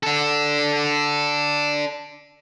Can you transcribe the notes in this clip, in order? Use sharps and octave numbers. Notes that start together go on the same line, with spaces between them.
D4 A4